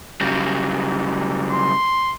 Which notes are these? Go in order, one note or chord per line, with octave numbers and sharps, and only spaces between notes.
C#3 F#3 G3
C6